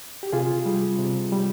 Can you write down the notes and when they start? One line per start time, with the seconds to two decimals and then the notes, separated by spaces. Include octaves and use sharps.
0.23 G4
0.33 C3 F4 G#4
0.66 G3
0.99 C3
1.32 G3